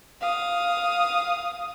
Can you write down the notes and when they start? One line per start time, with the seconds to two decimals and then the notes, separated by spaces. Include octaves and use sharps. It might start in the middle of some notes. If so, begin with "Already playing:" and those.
0.21 F5 D#6